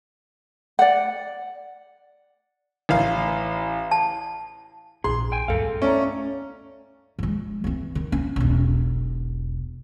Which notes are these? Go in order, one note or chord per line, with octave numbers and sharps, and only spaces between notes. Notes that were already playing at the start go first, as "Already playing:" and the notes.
D5 F#5
A1 F5
A5
A#1 G#4 C6
G5 G#5
D2 G2 A4 F5
A3 C#4 D5 A#5
F3 G#3
E3 C4
D#3
C#4
E1 B1